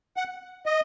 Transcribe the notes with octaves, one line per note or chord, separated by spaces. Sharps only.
F#5
D#5